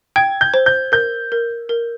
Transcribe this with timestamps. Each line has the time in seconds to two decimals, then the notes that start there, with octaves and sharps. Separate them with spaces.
0.16 G5 G#6
0.41 G6
0.54 C5
0.66 G6
0.92 A#4 G6
1.32 A#4
1.69 A#4